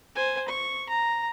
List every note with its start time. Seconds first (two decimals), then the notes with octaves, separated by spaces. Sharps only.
0.15 C5 G#5
0.48 C#6
0.90 A#5